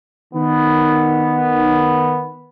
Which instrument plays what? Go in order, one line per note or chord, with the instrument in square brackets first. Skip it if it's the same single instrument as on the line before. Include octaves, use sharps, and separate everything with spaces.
[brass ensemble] D#3 B3